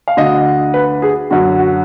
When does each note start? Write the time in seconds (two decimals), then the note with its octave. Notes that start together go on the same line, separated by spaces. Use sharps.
0.08 F5
0.17 D2 D3 D#5
0.74 B4
1.02 G#4
1.30 F#2 D3 F#4
1.59 F#4